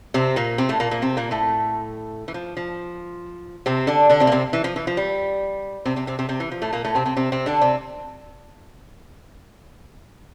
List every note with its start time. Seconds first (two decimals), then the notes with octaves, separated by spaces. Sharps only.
0.14 C3 C4
0.36 A#2 A#3
0.58 C3 C4
0.69 A2 A3
0.80 A#2 A#3
0.91 A#2 A#3
1.02 C3 C4
1.17 A#2 A#3
1.31 A2 A3
2.28 E3
2.34 F3
2.57 F3
3.66 C3 C4
3.87 D3 D4
4.09 D3 D4
4.20 C3 C4
4.27 A#3
4.32 C3 C4
4.53 E3
4.64 F3
4.76 E3
4.87 F3
4.97 G3
5.86 C3 C4
5.96 C3 C4
6.07 C3 C4
6.19 C3 C4
6.29 C3 C4
6.40 E3
6.52 F3
6.62 A2 A3
6.73 A#2 A#3
6.85 A2 A3
6.95 C3 C4
7.06 C3 C4
7.17 C3 C4
7.32 C3 C4
7.46 D3 D4
7.61 C3 C4